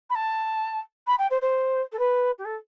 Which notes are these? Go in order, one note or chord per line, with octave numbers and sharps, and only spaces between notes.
B5
A5
B5
G5
C5
C5
A4
B4
G4
A4